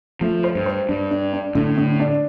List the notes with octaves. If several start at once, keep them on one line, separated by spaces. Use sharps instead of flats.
F3 A3
C5
G2
C5
G2 D4
D4
D4
A2 D3
D3
D4